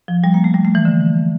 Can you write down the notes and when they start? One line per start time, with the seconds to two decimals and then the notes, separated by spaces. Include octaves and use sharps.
0.08 F3
0.24 G3
0.34 A#3
0.44 A3
0.54 G3
0.65 A3
0.75 E3
0.85 D3